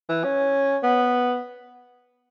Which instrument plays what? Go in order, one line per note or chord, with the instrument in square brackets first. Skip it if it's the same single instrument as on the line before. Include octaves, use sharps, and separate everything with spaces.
[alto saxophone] E3
C#4
B3